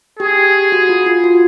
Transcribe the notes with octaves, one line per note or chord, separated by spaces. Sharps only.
G4 G#4
F#4
F4
F4
F#4